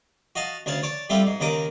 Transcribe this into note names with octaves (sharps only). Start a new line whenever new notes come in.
F#4 D#5 F5 A5
D2 C#3 C#5 F5 A5
C#5 D5 A5
G3 A3 C4 E4 F4 G4
G#2
D#2 C#3 A#4 D#5 D6